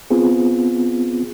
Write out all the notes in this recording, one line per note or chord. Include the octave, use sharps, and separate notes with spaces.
B3 C4 F4 G#4